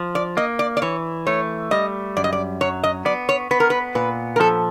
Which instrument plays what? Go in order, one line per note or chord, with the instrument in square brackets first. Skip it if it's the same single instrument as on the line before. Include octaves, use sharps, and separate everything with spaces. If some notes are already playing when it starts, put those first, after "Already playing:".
Already playing: [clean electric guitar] F3
[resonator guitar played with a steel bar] D5
[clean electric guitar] A#3 [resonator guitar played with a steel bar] D#5
[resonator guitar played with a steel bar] D5
D5
[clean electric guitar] E3 [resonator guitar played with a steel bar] C#5
[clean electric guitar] A3 [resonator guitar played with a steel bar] C#5
[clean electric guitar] G3 [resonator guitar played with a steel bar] D#5
[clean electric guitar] F#2 [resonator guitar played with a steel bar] D5
[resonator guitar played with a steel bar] D#5
D5
[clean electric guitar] F#3 [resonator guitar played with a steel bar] C#5
[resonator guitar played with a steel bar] D#5
[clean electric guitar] B3 [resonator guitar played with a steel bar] D5
[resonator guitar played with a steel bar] C#5
[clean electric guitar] B3 [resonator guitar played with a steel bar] B4
[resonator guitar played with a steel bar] A#4
B4
[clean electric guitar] A#2 [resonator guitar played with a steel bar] B4
[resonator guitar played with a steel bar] A#4
[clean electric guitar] F3 [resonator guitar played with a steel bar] A4